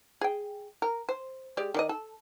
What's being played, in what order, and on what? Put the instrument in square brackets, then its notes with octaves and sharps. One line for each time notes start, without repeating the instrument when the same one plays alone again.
[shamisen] G#4 G5
A#4
C5
G#3 G4 D5
D#3 D5 D#5
A4